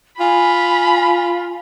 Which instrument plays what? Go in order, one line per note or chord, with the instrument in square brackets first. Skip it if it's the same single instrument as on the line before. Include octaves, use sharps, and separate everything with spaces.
[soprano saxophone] F4 [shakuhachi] G#5 [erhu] B5